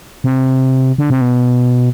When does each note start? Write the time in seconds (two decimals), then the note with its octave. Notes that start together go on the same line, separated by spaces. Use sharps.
0.24 C3
0.98 D3
1.10 C3
1.21 B2